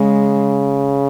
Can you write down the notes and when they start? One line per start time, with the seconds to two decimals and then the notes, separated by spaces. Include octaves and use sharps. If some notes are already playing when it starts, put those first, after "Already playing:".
Already playing: C#3 G#3